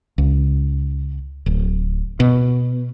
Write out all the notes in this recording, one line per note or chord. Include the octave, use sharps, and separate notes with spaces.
C#2
D1
B2